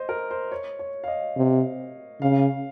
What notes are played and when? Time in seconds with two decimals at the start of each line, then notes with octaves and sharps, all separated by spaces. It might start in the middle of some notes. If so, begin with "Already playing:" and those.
Already playing: C5 D#5
0.09 A#4
0.31 C5
0.52 C#5
0.79 C#5
1.04 F5
1.08 D#5
1.37 C3
2.21 C#3 F5